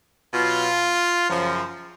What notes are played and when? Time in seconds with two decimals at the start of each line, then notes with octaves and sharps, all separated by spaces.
0.33 B2 F#3 F4
1.29 F#2 C#3 F3